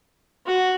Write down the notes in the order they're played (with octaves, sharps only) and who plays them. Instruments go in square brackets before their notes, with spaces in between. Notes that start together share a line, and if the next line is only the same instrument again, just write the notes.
[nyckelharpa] F#4